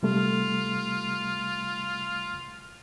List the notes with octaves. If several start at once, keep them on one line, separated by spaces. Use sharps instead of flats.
C3 G3 A3 F4